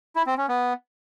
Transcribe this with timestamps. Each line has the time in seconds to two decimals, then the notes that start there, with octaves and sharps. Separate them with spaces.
0.16 E4
0.27 C4
0.38 C#4
0.49 B3